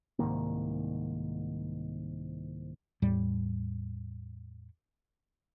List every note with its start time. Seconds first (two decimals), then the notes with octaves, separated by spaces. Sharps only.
0.19 C2 G#2 D#3 A#3
3.02 E2 A2 G3